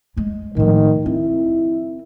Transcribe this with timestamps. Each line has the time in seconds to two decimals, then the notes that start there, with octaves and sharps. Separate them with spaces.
0.17 G3 G#3
0.57 A2 D#3 F3
1.06 C4 E4